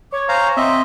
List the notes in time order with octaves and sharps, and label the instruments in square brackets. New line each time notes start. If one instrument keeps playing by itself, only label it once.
[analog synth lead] C#5 [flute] D6
[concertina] C5 F5 A#5 [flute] G#5
[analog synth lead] C4 [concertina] D#5 E5 [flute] C6